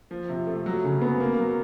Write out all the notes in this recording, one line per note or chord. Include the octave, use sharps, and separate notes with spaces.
F3
C3
A3
F#3
C#3
B3
A#3
F#3